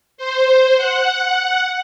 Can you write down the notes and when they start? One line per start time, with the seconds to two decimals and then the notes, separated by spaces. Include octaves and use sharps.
0.18 C5
0.76 F#5